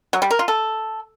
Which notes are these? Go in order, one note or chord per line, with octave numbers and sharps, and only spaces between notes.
F#3
G3
A#4
F4
A4